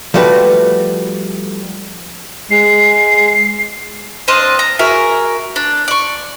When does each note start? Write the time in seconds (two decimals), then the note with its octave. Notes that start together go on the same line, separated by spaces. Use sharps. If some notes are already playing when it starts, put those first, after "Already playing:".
0.14 F3 G3 A3 F#4 A4 B4
2.51 G#3 C7
4.28 C4 D4 D#5 F5
4.59 A#5
4.79 F#4 G#4 A#4 E5
5.56 D4
5.88 D5 C#6